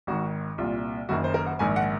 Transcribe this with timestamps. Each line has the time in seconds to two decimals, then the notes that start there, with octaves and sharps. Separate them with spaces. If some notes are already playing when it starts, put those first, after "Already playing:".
0.07 G#1 G#2 D#3 F#4
0.58 C2 A#2 F4
1.09 F#1 F#2 D#3 F#4
1.24 C5
1.34 A#4
1.46 F#5
1.59 A#1 G#2 D#3 G#5
1.76 F#5